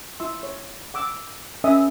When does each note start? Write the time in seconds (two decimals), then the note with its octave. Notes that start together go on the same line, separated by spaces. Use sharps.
0.20 E4 F4 C6 E6
0.43 C#5
0.94 F#5 D6 E6
1.64 C#4 A#4 D#5 E5 G#5 D#6